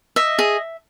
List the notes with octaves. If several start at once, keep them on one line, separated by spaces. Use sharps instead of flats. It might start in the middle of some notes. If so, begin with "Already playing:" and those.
D#5 E5
G#4